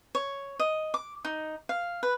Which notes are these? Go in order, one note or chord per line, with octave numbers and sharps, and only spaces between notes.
C#5
D#5
D6
D#4
F5
B4